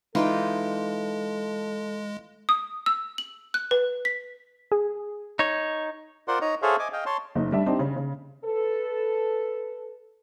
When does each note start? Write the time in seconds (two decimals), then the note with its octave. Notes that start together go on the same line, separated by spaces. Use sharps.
0.15 E3 G#3 D#4 F4 A4 G5
2.49 D#6
2.86 E6
3.18 F#7
3.54 F#6
3.71 B4
4.05 B6
4.72 G#4
5.39 D#4 C#5
6.28 F4 A#4 C5 D5 F#5 C6
6.41 D#4 C#5 D#5 A#5
6.62 G#4 A4 C5 C#5 E5 F5
6.79 D#5 G#5 D6
6.93 D#5 F5 G5
7.06 C#5 A5 C6
7.35 F#1 D#4
7.52 G3 D4 E5
7.66 C4 D4 D#4 G4
7.79 C#3
7.96 C#3
8.45 A4 B4